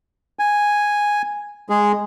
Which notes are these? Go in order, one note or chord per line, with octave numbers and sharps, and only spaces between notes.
G#5
G#3 G#4